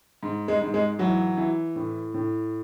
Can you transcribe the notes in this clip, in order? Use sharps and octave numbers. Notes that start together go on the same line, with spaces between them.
G#2
G#3
G#2
G#3
E3 F#3
E3
A2
A2